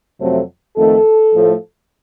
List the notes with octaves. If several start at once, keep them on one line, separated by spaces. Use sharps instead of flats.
F2 C3 F#3 A3 C5
F2 D#3 A3 A4
A2 F3 A3